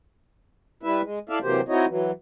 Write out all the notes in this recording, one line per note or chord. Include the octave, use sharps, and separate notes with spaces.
G3 E4 B4 E5
G#3
E4 A4 D5 E5 F5
C3 E3 F#3 A#3 G4 C5
C4 D#4 E4 F#4 C#5 D#5
E3 F#3